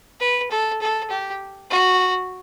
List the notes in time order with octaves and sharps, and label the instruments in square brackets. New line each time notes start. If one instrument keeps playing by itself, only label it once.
[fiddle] B4
A4
A4
G4
F#4